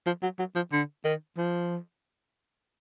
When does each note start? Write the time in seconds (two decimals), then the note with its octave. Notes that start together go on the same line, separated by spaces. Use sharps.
0.06 F3
0.23 F#3
0.39 F#3
0.56 F3
0.72 D3
1.05 D#3
1.37 F3